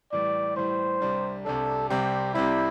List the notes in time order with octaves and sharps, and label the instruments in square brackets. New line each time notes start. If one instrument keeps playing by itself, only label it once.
[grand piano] A2 E3 G3 [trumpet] D5
[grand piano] A2 E3 G3 [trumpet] C5
[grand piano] C2 C3 G3 D4
[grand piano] C2 C3 G3 D4 [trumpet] A4
[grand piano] C2 C3 G3 C4 [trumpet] G4
[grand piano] C2 C3 G3 C4 [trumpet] E4